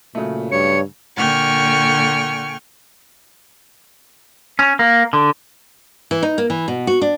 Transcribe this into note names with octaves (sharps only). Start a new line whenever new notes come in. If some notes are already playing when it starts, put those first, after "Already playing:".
A#2 C#3 F#3 A3
G2 C#5 C#7
A#2 D3 G5 G#5 C#6 F6
C#4
A#3
D3
E3
D#4
A#3
E3
B2
F#4
D4